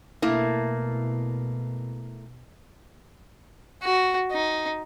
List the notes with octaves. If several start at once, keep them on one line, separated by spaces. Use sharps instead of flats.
B2 A3 A#3 E4
F#4
D#4